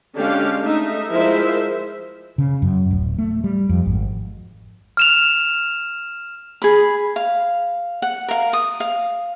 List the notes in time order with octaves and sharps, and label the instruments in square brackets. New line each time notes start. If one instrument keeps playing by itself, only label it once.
[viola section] D3 G#3 C#4 D4 G4 F5
A3 D#4 E5
F3 G#3 E4 A#4 C5 E5
[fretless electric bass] C#3
F#2
D1
A3
G3
F2
G#1
[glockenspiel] F6 E7 F7
[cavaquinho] G#4 B5
F5
F#5
A#4 F5
D#6
F5